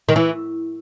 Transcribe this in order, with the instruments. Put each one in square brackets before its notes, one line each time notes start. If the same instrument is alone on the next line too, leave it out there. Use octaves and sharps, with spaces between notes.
[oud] D#3
E3